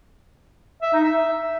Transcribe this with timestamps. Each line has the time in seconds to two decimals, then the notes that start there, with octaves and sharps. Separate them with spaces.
0.82 E5
0.93 D#4
1.04 E5